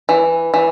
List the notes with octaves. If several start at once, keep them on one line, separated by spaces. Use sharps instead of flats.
E3
E3